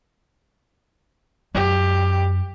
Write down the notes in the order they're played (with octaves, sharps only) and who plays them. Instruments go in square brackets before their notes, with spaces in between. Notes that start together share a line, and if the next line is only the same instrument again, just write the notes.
[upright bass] F#2 [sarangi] G4